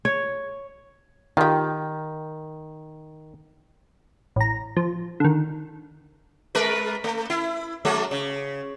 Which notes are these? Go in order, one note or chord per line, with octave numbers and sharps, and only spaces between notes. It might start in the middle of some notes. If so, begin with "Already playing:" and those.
C#5
D#3 F4 G4
A1 A#5
F3
D3 D#3
G#3 A#4 B4
A3
E4
F#3 G#3 A#3
C#3